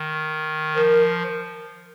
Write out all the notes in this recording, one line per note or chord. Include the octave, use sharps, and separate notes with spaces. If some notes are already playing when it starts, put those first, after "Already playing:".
Already playing: D#3
F3 A#4